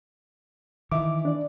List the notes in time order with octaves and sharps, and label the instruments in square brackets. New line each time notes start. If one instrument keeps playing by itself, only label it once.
[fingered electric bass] D#3 E3 [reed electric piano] E5 D6
[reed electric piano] D4 D5